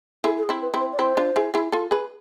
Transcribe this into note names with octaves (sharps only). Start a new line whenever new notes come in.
E4 G#4 A4
A4
G#4
C4 E4
B4
C4 E4
C5
D5
C4 E4 C5
D4 F4
E4 G#4
E4 G#4
F4 A4
G#4 B4